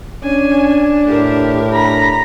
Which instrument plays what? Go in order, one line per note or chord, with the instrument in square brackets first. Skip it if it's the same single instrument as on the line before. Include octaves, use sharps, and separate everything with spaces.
[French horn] C#4 [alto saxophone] D4 [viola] G#5
[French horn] A2 [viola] G4 A#4
[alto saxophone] D4 [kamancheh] A#5 B5